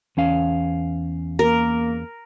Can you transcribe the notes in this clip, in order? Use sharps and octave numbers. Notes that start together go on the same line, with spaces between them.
E2 C#4 F5
A#3 A#4